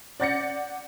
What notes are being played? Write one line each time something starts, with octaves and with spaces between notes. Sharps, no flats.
D5 F#5 G6 A6 A#6 C#7